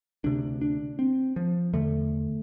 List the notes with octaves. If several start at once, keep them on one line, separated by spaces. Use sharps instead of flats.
D2 C3 D4
D4
C4
F3
E2 D3 A3